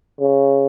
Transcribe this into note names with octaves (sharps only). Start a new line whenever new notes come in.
C#3